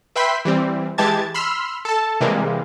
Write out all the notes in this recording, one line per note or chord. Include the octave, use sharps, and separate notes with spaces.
B4 E5 G5 B5 C6 B6
E3 G3 C4
E3 G#3 G4 A5 G#6 A6
B5 C6 E6 F6
A4 A5
C3 E3 G3 G#3 A#3